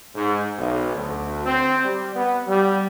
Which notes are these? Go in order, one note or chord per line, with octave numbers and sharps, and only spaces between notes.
G#2
B1
D2
C4
G3
B3
G3